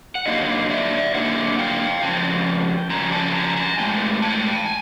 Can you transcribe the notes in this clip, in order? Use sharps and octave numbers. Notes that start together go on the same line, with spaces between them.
F#5
D3 F#3 A#3 D#4 D#5 F5
D5 E5
D3 F#3 A#3 D#4 E5 F#5
F5 G5
F2 C#3 F3 G5 A5
F2 C#3 F3 G#5 A#5
G5 A5
G#5 A#5
G#5 A#5
A2 E3 G#3 G5 A5
G5 A5
G#5